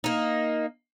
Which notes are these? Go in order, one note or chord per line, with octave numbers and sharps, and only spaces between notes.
A#3 D#4